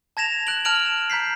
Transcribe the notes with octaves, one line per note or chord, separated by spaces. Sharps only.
A5 G#6 A#6 E7 F7
F#6 D7 F#7
A5 F6 F#6 D7 F7 F#7
E7
A#5 G6 B6 C7